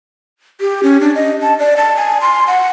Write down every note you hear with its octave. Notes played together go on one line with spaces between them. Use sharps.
G4
C#4
D4
D#5
A5
D5
A5
G#5
C6
F#5